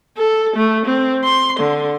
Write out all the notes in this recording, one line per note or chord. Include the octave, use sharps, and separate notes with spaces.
A4
A3
C4
C6
D3